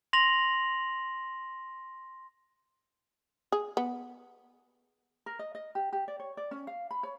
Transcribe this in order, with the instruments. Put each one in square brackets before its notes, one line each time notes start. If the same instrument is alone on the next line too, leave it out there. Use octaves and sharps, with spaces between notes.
[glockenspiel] C6 A#6 F7 F#7
[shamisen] G#4
B3
[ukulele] A#4
D#5
D#5
G4
G4
D5
C#5
D5
C#4
F5
B5
C#5